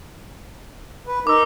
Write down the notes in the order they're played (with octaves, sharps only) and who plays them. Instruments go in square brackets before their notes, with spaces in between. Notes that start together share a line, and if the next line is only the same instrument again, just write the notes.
[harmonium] B4
[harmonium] D#4 A#4 [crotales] D6 E6